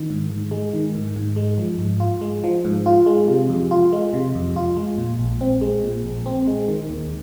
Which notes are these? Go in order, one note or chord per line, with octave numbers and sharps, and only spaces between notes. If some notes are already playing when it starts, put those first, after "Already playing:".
Already playing: D#3
G#2
G#2
G#3
D#3
G#2
G#2
G#3
F3
G#2
F4
G#3
F3
G#2
F4
G#3
C3
F2
F4
G#3
C3
F2
F4
G#3
A#2
A#1
C4
G#3
A#2
A#1
C4
G#3
D#3
D#2